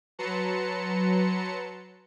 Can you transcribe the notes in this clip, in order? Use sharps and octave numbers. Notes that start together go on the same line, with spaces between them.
F#3 B4 A5 A#5 C6 C#7